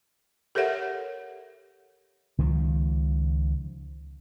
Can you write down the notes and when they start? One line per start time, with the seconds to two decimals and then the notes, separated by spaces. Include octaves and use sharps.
0.55 G4 A4 A#4 C#5 E5 F#5
2.38 C#2 D#3 F3